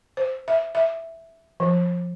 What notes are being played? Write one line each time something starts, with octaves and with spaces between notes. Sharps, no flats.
C5
E5
E5
F3